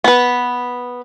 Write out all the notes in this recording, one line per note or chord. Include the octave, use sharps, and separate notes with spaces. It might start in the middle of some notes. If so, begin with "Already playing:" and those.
B3 B4